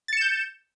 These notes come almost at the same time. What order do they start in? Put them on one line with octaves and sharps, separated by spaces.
A6 C#7 E7 G6